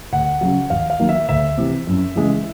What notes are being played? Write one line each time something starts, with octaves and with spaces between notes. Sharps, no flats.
D2 F#5
C#3 F#3
D#2 F5
F5
D#3 F#3 A#3
E5
D2 E5
C3 E3
F#2
C#3 E3 G#3